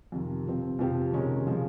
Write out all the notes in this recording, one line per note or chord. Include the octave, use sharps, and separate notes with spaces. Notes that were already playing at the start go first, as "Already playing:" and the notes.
F2 C3 D#3
C3 F3 C4
F2 C3 F3 C4 G4
C3 D#3 G#3 C#4
C#3 F3 G#3